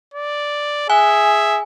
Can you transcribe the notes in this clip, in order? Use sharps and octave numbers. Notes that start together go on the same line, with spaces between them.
D5
G#4 E5 G#5